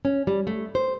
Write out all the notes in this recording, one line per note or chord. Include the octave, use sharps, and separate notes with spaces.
C#4
G3
A3
C5